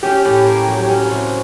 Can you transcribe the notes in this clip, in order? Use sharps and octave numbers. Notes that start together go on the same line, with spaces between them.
C#4 G4
A2
A#3
F#3
C#4
C3